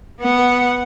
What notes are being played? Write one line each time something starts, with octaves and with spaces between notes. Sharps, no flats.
B3 F#5